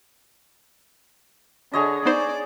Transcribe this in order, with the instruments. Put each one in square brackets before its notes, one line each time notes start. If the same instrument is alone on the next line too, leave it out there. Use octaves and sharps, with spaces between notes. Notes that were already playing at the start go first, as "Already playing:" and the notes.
[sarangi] D3 [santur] G#4 C#5 D#5
[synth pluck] B3 D#4 C5 [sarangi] D5